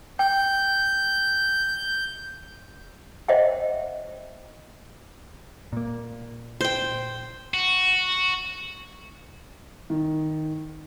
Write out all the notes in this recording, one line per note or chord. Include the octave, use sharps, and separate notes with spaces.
G5 G6
C5 D#5 E5 F#5 G5
A#2 A#3
C5 G5
F#4
D#3